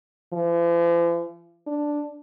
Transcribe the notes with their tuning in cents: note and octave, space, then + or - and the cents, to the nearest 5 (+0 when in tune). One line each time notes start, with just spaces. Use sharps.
F3 -45
D4 +0